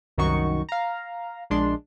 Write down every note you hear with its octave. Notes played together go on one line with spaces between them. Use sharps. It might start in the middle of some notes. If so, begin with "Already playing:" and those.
C2 F#2 D#3 D#4 F#4 C#6
F5 A#5
A#1 G#3 D4 C6